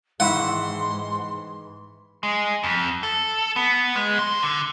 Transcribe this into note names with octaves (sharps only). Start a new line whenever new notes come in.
G#2 D#3 E3 G#3 E5 F#5 C6
G#3
F2
A4
B3
G#3
C5
D3